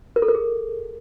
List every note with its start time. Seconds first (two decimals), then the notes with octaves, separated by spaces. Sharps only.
0.16 A#4
0.22 A4
0.28 A#4
0.35 G#4